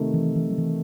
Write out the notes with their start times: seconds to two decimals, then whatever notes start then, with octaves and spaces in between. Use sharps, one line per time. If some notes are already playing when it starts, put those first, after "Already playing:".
Already playing: C3 D#3 A3
0.14 E3
0.36 E3
0.50 F#3
0.58 E3